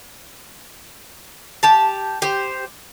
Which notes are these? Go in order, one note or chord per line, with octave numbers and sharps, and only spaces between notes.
G4 A5
G4 C5